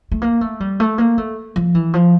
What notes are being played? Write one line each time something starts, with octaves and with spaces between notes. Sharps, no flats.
A3
A#3
A3
G3
A3
A#3
A3
F3
E3
F3